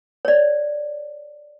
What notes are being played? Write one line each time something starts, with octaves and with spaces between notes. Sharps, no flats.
C#5 D5